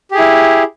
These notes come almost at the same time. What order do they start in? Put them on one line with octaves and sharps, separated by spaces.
G4 G#4 E4